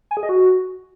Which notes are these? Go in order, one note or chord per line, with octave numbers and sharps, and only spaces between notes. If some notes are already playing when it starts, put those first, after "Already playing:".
G#5
G#4
D#5
F#4